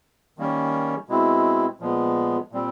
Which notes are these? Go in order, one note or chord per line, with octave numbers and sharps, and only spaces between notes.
D#3 G3 A#3 C#4
B2 G#3 C4 E4
A#2 F3 G#3 B3
A#2 G3 C4